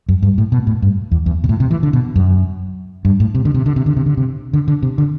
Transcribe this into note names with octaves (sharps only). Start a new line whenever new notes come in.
F#2
G2
A2
B2
A2
G2
E2
E2
B2
A2
C3
E3
D3
B2
F#2
G2
A2
C3
D3
C3
D3
C3
D3
C3
D3
C3
D3
D3
C3
D3